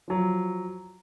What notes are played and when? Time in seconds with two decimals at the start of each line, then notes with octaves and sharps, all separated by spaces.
0.08 F3 F#3